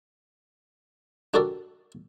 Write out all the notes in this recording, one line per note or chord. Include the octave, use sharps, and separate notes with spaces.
D4 F#4 G4 A4 A#4 D5